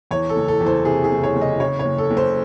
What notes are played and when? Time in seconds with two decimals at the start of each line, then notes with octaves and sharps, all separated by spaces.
0.11 E2 C#5
0.29 A4
0.36 F#1
0.48 A4
0.60 E2
0.66 C5
0.85 C3 G#4
1.04 G#4
1.11 F#1
1.23 C#5
1.36 F#1
1.41 D#5
1.60 C#3 C#5
1.79 C#5
1.85 F#1
1.98 A4
2.10 F#1
2.17 C5